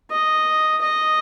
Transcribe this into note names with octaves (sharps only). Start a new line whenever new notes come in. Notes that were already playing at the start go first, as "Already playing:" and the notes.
D#5
D#5